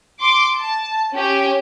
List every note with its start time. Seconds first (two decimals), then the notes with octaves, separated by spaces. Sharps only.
0.20 C6 D6
0.59 A5
1.15 C#4 G4